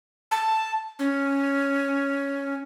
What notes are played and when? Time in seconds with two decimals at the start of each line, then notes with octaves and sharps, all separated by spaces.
0.31 A5
0.99 C#4